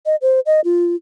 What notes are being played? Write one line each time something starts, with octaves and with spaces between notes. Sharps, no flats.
D#5
C5
D#5
F4